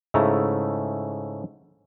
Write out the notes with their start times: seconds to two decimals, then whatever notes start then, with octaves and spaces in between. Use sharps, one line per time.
0.14 G#2 C#3 A3 E4 A#5